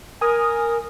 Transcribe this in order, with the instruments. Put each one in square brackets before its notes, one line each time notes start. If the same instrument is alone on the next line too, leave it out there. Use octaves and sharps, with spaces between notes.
[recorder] A#4 [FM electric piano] G#5 D#6